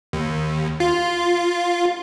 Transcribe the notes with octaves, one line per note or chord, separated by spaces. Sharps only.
D#2
F4